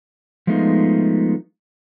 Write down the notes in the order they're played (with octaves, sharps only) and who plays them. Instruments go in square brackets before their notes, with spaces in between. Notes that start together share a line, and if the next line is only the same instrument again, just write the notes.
[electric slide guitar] F3 G#3 A3 B3 D#4 F4